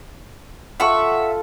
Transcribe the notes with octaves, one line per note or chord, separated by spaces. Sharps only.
F4 A4 E5 F#5 C#6